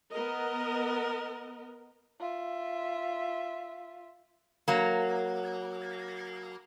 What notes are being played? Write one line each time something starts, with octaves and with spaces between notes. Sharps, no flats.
B3 A#4 D#5
F4 E5
F#3 A#3